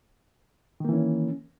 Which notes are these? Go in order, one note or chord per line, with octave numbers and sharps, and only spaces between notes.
D#3 E3 A#3 C#4